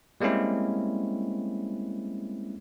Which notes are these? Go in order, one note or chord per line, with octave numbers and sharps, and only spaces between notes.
G3 G#3 A#3 C4 C#4 E4